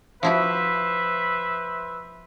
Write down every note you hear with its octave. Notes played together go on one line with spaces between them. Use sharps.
F3 E4 F#4 B4 C5 E5